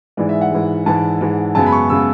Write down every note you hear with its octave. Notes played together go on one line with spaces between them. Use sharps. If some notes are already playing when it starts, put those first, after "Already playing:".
G#2 E3 G#3 D5
E5
F#5
G#2 E3 G#3
G#2 E3 G#3 A5
G#2 E3 G#3
F#2 C#3 G#3 B3 A5
B5
C#6
C#3 G#3 B3 E6